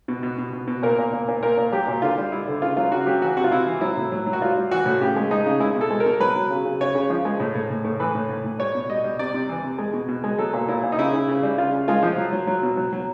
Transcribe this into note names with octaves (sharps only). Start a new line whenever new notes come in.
B2
B2
B2
B2
B2
A#2 A#4
A#2
A#2
A#2
A#2 A#4
A#2
F#3 G4
A#2
D3 F4
G3
G3 E4
D3
C#3 F4
F#3 F4
C#3 F#4
F#3 G4
E3 F#4
C3 F#4
F4
C3 E4
E3
F#3 E4
A2
F#3
F#3
F#4
G3 F4
G3
E3 F#4
A2
C#3 G4
G#3
G#3 D#4
C#3
G#3 E4
B2
A4
G#3
A#4
B2
F#3 B4
F#3
C#3
C#3
C#3 C#5
C#3
F3
G#3
A2
A2
A2
A2
E3 B4
A2
A2
A2
G3 C#5
B2
G3 D#5
G3
C3 D5
C3
E3
C3
G#3
B2
B2
G#3
F#3 A4
A#2
A#2 E4
A#2
D#4
C#3 E4
C#3
C#3
G3
C#3 F4
C#3
G#3 F4
F3
F#3
F#3
F#3
B2
F#3
F#3